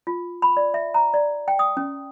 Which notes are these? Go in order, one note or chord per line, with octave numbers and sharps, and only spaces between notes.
F4
B5
D5
E5
A#5
D5
G5
D#6
C#4